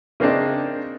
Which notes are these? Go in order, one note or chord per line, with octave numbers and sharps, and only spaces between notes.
C#3 A#3 C4 D4 D#4